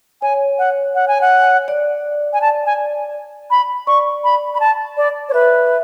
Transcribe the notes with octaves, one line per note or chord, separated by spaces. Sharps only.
C#5 G#5
F#5
F#5
G#5
F#5
D5
G#5
A5
G#5
B5
D5 C#6
B5
B5
A5
D5
C#5
B4 E5